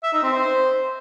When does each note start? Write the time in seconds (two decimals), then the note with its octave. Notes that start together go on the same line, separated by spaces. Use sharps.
0.03 E5
0.13 D#4
0.23 C4
0.33 C5